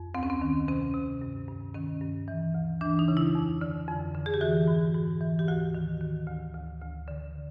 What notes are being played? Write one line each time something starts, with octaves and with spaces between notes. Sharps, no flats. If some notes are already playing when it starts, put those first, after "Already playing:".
Already playing: F2
D2 C4
C#4
C4
D#3
C3 C#4
C3
G2
G2
D#3 C#4
G2
E3
D2
E3 D4
D#4
C#3
E4
F2
D3
F2
D3
G#4
G4
E3 F#4
G#2
G#2
E3
G4
D2 F#4
D#3
D#3
D2
D2
D2
D3